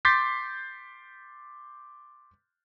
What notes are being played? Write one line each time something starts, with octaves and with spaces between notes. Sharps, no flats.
C6 D6 G6 A6 B6 C7